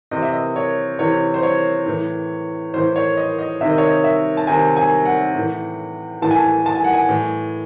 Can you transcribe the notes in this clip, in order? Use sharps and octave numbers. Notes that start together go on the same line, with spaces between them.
C3 E3 D#5
E5
D#5
C#5
C3 E3 C#5
C5
C#5
A2 E3
A2 E3 C5
C#5
D#5
D#5
C3 D#3 E5
D#5
C#5
D#5
E5
A5
C3 D#3 G#5
G#5
F#5
A2 E3
A2 E3 A5
G#5
A5
A5
G#5
F#5
G#5
A2 E3